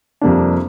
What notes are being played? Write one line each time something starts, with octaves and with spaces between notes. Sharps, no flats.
F2 C3 G3 A#3 D4